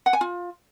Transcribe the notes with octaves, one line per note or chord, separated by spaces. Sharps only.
F#5
G#5
F4